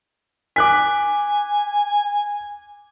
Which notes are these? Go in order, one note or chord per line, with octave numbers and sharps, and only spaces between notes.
G#5 D6 F#6 B6